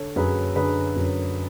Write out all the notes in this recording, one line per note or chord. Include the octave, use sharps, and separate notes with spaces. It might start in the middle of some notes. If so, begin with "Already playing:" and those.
Already playing: D3 A4 C#5
F#2 G#4 B4
D3 G#4 B4
F#2